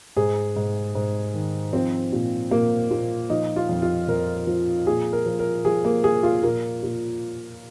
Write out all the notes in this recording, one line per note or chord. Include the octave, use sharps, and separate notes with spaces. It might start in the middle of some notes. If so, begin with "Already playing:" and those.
G#2 G#4
G#2
G#2
D#3
F3 C4
A#2
A#2 A#3
A#2
F3 D#4
F4
F2
F4
F2 A#4
F3
A#2 G#4
A#4
F3
A#4
F3 G#4
A#3
F3 G#4
F4
A#2 A#4
A#2